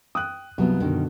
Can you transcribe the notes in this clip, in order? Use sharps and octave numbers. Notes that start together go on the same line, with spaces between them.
G5 D#6 F#6
C2 F#3 B3 F4
F#2 B2 D3 D#3